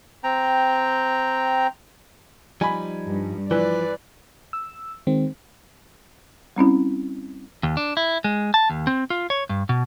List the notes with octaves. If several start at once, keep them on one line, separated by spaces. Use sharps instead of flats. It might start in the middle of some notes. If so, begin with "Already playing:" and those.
C4 G5 A#5
F3 G3 D#4 G#5 B5
G2
E3 F3 B4 D5
E6
D#3 G#3 C4
G3 C4 C#4 E4
D#2
D4
E4
G#3
A5
D#2
C4
F4
C#5
G2
B2